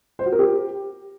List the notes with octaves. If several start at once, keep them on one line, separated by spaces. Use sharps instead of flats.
C5
F#4
A#4
G4